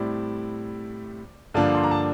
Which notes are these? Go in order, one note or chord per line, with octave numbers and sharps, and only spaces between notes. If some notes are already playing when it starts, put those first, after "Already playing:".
Already playing: A2 G3 C4 E4 D5
G2 D3 F3 A#3 D4 F5
C6
A#5
A5